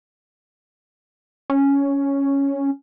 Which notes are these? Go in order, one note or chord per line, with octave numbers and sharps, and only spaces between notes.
C#4